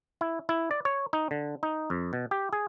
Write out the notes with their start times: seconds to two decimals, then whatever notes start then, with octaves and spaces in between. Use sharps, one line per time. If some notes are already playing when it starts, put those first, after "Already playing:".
0.21 E4
0.49 E4
0.71 D5
0.85 C#5
1.13 D#4
1.31 D3
1.63 D#4
1.90 F2
2.13 B2
2.31 G4
2.53 G#4